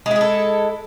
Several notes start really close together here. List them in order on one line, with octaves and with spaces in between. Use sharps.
G#3 E4 G#4 A4